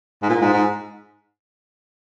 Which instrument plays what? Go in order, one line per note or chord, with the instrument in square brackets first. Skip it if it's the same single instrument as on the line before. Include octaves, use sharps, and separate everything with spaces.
[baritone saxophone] G#2
A#2
G#2
G#2